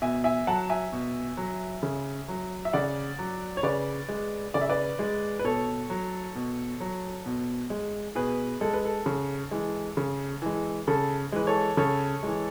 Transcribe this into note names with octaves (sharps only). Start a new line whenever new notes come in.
B2 E5 G#5
E5 G#5
F#3 F#5 A5
E5 G#5
B2
F#3
C#3
F#3
E5
C#3 D5 F#5
F#3
C#5
C#3 B4 D5
G#3
C#3 D5
E5
B4 D5
G#3
B4
B2 A4 C#5
F#3
B2
F#3
B2
G#3
B2 G#4 B4
G#3 A4
B4
A4
C#3
E3 G#3
C#3
E3 G#3
C#3 A4
E3 G#3 B4
A4 C#5
C#3 A4 C#5
E3 G#3